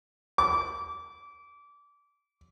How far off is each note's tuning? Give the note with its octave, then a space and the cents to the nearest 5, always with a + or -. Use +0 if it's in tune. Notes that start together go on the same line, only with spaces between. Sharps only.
D6 -25